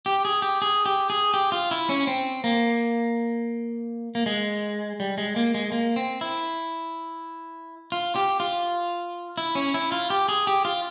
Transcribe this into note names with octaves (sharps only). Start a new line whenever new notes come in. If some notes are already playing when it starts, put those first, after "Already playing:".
G4
G#4
G4
G#4
G4
G#4
G4
F4
E4
C#4
C4
A#3
A#3
G#3
G3
G#3
A#3
G#3
A#3
C4
E4
F4
G4
F4
E4
C#4
E4
F4
G4
G#4
G4
F4